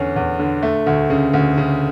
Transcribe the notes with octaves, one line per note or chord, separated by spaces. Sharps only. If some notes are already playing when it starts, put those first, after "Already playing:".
Already playing: E2 D3 C#4
E2
D3
A3
D2
C#3
D2
C#3